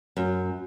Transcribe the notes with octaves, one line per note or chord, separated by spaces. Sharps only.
F#2